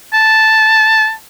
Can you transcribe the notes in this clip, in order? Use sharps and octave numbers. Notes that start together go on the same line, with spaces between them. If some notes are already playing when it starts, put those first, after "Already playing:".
A5